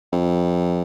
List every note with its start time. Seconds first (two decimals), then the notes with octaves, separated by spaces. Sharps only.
0.12 F2